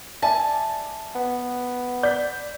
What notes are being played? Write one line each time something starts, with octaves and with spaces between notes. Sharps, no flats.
D5 E5 G#5 A5
B3
D5 G6 B6